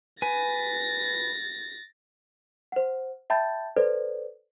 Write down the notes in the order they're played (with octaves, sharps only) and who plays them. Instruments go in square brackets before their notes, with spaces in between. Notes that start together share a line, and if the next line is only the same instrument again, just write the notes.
[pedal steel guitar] B4 G#5 [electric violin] A6 A#6
[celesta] C5 F#5
E5 G5 A5 B5 G6 A6
A4 B4 C5 D5